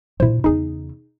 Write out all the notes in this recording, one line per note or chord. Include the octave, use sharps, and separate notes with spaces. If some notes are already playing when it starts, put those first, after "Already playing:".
A#2 D4 E4 C5
E2 C#3 D#4 G#4